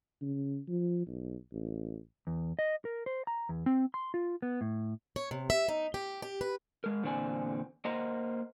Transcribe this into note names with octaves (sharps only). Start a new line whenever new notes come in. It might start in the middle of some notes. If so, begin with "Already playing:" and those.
C#3
F3
B1
A1
E2
D#5
A#4
C5
A#5
E2
C4
C6
F4
B3
A2
C#5
C3
E5
D#4
G4
G4
B4
G#3 A#4
E2 A#2 D3 C4 D5 G#5
A#3 A#4 C5 D#5 F#5 A#5